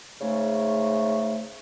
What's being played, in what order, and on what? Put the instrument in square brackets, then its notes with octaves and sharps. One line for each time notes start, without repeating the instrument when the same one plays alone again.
[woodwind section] G#2 C#3 A3